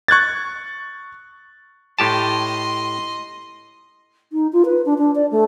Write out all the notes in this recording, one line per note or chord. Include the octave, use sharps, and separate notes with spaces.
C#6 F#6 G#6 A6
A2 G4 D#5 A5 C6
D#4
F4
B4
D4
D4
D5
A3